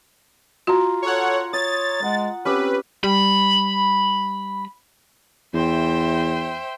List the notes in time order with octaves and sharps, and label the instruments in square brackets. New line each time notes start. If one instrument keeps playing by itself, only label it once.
[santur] F4 A#5 [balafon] F#4
[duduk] A4 [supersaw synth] C#5 F#5
[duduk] C#5 [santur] D#6 [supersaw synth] A6
[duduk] G#3 [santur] F#5
[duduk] C4 [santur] C#4 G4 E6 [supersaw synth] B4
[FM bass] G3 [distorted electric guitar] B5
[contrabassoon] E2 [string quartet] C5 E5 G5